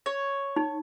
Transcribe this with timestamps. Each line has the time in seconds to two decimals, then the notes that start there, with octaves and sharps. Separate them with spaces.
0.06 C#5
0.56 D#4